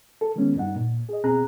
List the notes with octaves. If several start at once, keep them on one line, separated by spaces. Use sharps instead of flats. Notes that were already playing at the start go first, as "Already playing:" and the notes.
A4
D#3 G#3 A#3 B3 C#4
G2 D#4 F#5
A#2
G#4 D#5
B2 C4 G#4 A#5 F#6